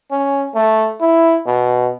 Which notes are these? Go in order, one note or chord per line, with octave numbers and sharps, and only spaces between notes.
C#4
A3
E4
B2